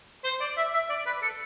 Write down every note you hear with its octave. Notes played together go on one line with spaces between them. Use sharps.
C5
D5
E5
E5
D5
B4
A4